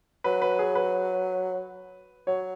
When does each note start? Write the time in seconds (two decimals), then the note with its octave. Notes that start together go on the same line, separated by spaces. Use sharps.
0.24 F#3 B4
0.42 B4
0.59 G#4
0.75 B4
2.27 F#3 C#5